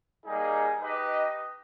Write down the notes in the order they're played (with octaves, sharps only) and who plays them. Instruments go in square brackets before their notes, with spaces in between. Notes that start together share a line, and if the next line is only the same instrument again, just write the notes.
[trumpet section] G3 A#3 D#4 G#4
D#4 G4 B4 D#5 G5